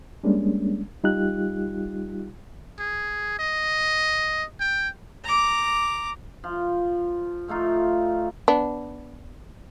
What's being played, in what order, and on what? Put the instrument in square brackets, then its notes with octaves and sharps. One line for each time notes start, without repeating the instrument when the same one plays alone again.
[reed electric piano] G3 G#3 A#3 C#4 D4
G3 D#4 F4 G4 F#6
[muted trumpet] G#4
D#5
G5
[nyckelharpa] A#5 D6
[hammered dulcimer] F3
F3 A3 D#4 F4
[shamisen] B3 D4